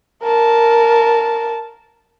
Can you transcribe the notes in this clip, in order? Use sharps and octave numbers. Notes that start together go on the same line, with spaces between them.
A#4 A5